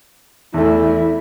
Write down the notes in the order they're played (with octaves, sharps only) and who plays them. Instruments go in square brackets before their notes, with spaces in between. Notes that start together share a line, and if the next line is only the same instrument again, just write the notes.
[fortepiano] E2 A3 [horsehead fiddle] E4